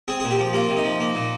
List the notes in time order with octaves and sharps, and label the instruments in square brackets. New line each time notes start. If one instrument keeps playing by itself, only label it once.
[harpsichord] C4 G#4
A#2 G#4
G4
F3
A#3 F4
C3
D#4
F3
A#3
A#2